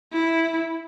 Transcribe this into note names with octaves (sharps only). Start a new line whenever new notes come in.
E4